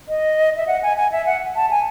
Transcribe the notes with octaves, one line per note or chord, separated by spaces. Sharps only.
D#5
E5
F#5
G#5
G#5
E5
F#5
A5
G#5